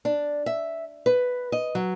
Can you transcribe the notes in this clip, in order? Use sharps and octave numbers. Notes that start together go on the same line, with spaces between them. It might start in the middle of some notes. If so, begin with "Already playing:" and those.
D4
E5
B4
D#5
F#3